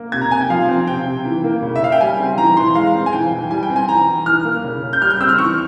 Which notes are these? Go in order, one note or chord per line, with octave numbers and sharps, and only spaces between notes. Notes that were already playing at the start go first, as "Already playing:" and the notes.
Already playing: A#3
C3 G#6
A#5
C3 G#5
G5
F3 F5
C4
C3 G5
C3
E3
A#3
C#3
E5
C#3 F5
G5
G3 G#5
C4
E3 A#5
E3 C6
G#3 F5
C4
G#5
E3 G5
E3
G3 G#5
G5
C4
G#5
E3 A#5
E3
E3 F6
A#3
C#3
C#3
G6
G3 F6
G6
C4 E6
F6
E3 C#6